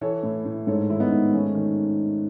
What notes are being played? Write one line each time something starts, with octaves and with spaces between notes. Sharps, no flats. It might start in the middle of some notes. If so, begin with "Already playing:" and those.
E3 A4 C#5
A2
A2
G#2 A4 C#5
D#3 E4
B3 D#4
G#2
D#3 A3 C#4
D#3